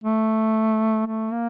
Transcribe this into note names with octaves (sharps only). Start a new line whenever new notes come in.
A3
A3
A#3